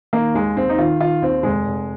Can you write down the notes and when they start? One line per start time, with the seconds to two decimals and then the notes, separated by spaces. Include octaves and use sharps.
0.13 D#3 A#3
0.34 D#2 G#3
0.57 D#2 C4
0.69 D#4
0.78 D#3 F4
1.00 D#3 F4
1.22 D#2 C4
1.43 F1 G#3
1.66 F1